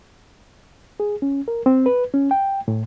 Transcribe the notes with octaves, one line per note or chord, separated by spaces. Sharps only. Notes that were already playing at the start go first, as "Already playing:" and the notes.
G#4
C#4
A#4
C4
B4
C#4
G5
A2